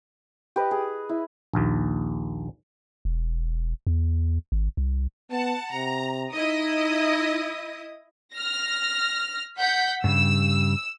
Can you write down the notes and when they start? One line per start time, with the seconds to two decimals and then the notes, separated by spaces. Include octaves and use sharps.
0.56 G4 B4 D#5
0.71 G#4
1.09 E4
1.53 A#1 D#2
3.05 E1
3.87 E2
4.52 G#1
4.77 C2
5.31 B3 F#5 A5
5.72 C3 A#5
6.33 D#4 E4 D#5 D#6
8.34 F6 A#6
9.58 F#5 G6 B6
10.04 G2 C#3 G3 E6